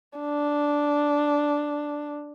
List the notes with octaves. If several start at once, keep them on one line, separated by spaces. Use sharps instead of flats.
D4